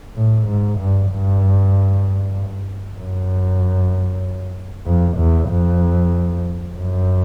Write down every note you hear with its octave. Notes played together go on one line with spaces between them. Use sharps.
A2
G#2
G2
G2
F#2
F2
E2
F2
F#2